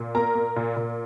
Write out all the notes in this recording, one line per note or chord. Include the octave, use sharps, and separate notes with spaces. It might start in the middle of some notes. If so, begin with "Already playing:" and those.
Already playing: A#2
A#3 A#4 A#5
A#3
A#2
A#2